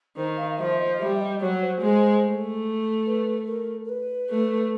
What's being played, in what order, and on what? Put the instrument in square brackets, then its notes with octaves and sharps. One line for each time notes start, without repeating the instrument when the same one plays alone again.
[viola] D#3 [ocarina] C5
[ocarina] F5
F5
[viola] F3 [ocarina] E5
[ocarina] D#5
[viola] G3 [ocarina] E5
[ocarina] D#5
[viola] F#3 [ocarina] C#5
[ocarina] C5
[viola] G#3
A3
[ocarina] B4
A#4
A#4
B4
[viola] A3